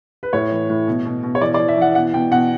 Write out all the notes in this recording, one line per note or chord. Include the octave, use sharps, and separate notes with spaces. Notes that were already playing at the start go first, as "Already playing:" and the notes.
B4
A2 C#5
E3
A2
B2
B2
B2
C#5
E3 D5
D5
E3
E5
E3 F#5
B2 F#5
B2 G5
B2 F#5